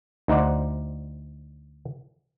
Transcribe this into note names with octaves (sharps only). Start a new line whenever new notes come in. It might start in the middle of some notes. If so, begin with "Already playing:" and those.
D2 D#4 C5 D5 F#5